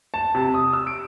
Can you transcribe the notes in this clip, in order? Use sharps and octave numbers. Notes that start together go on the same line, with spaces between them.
A5
C3
D#6
E6
D7